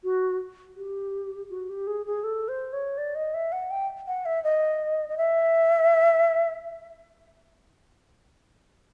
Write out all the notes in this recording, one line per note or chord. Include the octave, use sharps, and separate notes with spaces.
F#4
G4
F#4
G4
G#4
G#4
A4
C5
C#5
D5
D#5
E5
F#5
G5
F#5
E5
D#5
D#5
E5